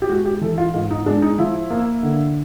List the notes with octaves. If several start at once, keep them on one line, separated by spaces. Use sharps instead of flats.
G4
G#3 F#4
G4
E3 A4
F4
G#2 F4
D#4
G#3 D4
D#4
F3 E4
A#3
D3